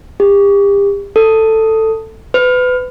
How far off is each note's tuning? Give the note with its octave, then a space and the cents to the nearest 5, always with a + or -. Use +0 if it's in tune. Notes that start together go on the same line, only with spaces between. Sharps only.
G4 +35
A4 +10
B4 +30